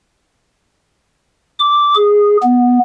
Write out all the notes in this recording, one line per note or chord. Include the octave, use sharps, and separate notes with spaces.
D6
G#4
B3